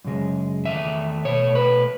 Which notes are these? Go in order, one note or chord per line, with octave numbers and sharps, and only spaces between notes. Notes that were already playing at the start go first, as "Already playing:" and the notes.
F#2 C#3 G#3
E2 D#3 A3 E5
B2 A3 C#5
B4